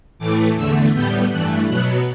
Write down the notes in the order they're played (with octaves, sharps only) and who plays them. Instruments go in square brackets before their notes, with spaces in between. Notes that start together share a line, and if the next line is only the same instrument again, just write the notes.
[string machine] A2 E3 A3 D6
E2 D3 A3 E6
A2 G3 B3 G6
G2 E3 A3 F#6
B2 F#3 B3 F#6